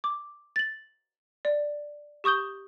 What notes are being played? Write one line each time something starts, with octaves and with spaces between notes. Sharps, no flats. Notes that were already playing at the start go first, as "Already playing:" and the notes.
D6
A6 F#7
D5
G4 C#6 D#6 G6 G7